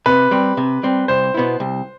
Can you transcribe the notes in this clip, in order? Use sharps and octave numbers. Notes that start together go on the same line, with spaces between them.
C3 B4
G3 C4
C3
G3 C4
C2 C5
B2 B3 E4
C2